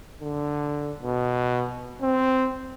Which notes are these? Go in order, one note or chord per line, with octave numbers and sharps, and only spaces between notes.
D3
B2
C4